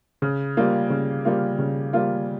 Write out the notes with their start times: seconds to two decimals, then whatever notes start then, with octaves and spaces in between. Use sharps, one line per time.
0.22 C#3
0.57 G3 A#3 F4
0.90 C#3
1.25 G3 A#3 F4
1.59 C#3
1.93 G3 A#3 F4